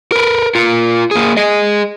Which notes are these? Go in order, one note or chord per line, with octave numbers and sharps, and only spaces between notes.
A#4 B4
F4 A#4
A#3 G#4
G#4 D#5